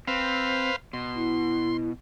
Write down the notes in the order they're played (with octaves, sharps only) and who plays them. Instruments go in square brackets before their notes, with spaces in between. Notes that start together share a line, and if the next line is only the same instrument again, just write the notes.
[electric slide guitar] C4 [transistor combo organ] B4 C5 F5
[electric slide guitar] B2 [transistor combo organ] C6
[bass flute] E4